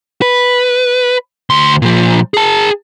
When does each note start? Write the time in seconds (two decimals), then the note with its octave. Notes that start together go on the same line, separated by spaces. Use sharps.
0.22 B4
1.50 D2 C6
1.82 A#2 F3
2.34 G#4 A5